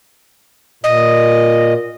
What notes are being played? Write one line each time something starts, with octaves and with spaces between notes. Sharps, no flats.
A#2 D#5